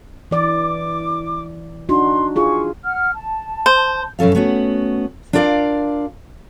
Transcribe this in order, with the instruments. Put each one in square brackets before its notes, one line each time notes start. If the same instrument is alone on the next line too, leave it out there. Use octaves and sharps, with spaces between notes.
[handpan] E3 D5 [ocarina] D6
[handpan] D4 D#4 F#4 [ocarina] C6
[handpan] F4 G#4 [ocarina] C#6
[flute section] F#5 F6
A5
[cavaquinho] C5
[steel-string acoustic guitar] F#2 B2 C#4 A4 F5
A3 B3 C#4 F#4
D4 F4 A#4 D5 F5